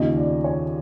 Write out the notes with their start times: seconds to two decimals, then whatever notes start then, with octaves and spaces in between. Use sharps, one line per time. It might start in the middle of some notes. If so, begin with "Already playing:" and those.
Already playing: D#2 C#3 F3 D#5
0.17 D5
0.44 C#5